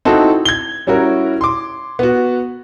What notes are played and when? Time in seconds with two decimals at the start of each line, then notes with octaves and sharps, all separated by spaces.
0.05 C4 D#4 E4 F#4 A4
0.45 G#6 G7
0.87 G3 C#4 E4 F#4 A#4
1.41 C6 D6
1.99 B3 F#4